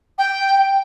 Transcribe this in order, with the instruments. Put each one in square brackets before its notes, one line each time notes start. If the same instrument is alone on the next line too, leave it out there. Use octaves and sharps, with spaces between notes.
[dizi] G5